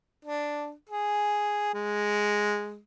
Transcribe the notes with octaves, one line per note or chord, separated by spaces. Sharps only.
D4
G#4
G#3